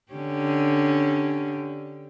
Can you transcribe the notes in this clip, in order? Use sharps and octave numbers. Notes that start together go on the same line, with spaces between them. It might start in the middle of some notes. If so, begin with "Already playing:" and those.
D3 C#4 G4